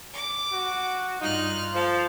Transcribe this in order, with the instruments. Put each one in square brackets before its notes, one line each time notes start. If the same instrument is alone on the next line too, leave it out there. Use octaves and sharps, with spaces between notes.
[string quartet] D6
[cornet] F#4
[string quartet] G2 F6 F#6 [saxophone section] D#4 [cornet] F4
[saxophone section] F3 [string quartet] A4 F5